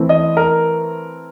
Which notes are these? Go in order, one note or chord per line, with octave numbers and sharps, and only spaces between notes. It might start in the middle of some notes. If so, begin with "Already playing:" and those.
Already playing: E3 A3 C4
D#5
A#4